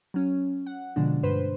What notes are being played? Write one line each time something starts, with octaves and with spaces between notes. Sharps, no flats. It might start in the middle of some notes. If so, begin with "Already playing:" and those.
F#3 C#4
F#5
B2 D3 F3 G#3 D4
G2 B4 C5